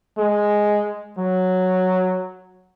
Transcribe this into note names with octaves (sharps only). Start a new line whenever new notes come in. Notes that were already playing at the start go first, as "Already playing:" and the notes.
G#3
F#3